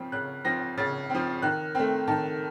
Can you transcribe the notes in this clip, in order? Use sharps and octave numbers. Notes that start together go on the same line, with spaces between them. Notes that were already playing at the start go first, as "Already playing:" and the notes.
Already playing: C#3 F3 C4
C#3 F#6
F3 C4 A#6
C#3 A6
F3 C4
D#3 F#6
A3 C4
D#3 A5